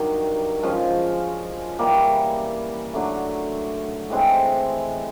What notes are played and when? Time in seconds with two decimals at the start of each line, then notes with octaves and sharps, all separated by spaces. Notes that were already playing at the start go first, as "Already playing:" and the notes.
Already playing: G2 D#3 F#3
0.62 F3 G#3 C#4 F4
1.79 E3 G3 A#3
2.93 D3 F#3 A3
4.10 A2 E3 G#3 C4